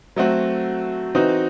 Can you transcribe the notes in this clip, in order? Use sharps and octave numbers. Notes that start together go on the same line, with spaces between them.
F#3 A3 C4 F#4
E3 C4 D#4 F#4